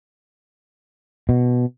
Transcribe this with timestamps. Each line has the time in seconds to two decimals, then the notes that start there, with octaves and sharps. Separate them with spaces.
1.29 B2